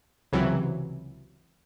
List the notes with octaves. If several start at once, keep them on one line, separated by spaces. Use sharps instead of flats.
C#2 C3 E3 F#3